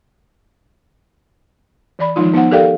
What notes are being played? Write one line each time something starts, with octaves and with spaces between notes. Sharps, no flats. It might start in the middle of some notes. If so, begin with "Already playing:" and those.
E3 D5 B5
D#3 F3 G#3 D#4 F4
B3 D#4 C5 F#5
G4 A4 A#4 D5 F5 G5